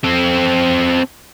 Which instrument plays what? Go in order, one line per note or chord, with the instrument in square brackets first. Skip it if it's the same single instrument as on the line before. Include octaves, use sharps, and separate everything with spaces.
[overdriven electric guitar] C4 A4